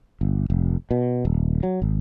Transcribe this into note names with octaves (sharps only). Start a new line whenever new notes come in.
G1
F1
B2
D#1
F#3
G#1